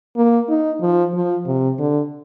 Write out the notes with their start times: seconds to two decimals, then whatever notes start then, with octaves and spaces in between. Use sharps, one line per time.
0.17 A#3
0.49 D#4
0.81 F3
1.14 F3
1.47 C3
1.79 D3